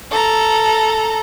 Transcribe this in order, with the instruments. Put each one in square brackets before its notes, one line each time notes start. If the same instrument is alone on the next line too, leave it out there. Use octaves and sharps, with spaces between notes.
[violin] A4 A#5